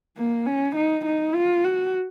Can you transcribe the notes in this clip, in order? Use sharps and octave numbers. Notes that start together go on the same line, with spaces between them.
A#3
C#4
D#4
D#4
F4
F#4